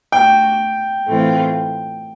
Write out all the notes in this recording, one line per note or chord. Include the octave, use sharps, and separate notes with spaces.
A3 D4 F#4 G5
A2 E3 A3 C4 F4